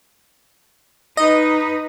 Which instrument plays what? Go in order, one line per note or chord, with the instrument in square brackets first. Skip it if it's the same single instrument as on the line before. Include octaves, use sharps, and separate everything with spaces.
[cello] D#4 B4 [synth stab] D#5